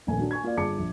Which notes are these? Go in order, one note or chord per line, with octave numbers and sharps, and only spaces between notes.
D#1 A#1 A3 G#5
D4 F#4
G#5 C#6 G#6
A#3 F4 D5 F5
G1 F4 G#4 A5 D6 C#7
A#1